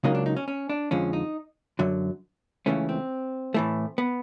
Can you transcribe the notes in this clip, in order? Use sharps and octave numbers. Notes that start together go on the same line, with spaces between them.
C#2 C#3 F#3 A#3 D#4
D4
D#4
C#4
C#4
D4
F2 D3 F3 G#3 C#4
D#4
F#2 D3 F#3
C#2 C#3 E3 A3 C#4
C4
A2 E3 A3
B3